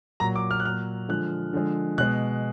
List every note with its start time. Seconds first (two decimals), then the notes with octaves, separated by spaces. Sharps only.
0.20 A#2 F#3 A#5
0.36 D6
0.51 F6
0.60 F#6
0.64 A#2 F#3 F6
1.09 D3 F3 G#3 F#6
1.53 D3 F3 G#3
1.98 B2 G#3 F#6